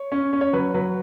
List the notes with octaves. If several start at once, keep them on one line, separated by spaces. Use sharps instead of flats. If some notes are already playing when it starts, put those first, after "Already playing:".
Already playing: C#5
C#4
C#4
C#5
F#3 B4
F#3 B4